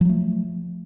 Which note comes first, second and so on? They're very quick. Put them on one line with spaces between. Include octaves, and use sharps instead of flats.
F3 F#3 A3